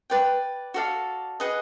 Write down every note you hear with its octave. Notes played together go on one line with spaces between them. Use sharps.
B4 D5 G5
F#4 A4 D5 F5
G#4 B4 D#5 F#5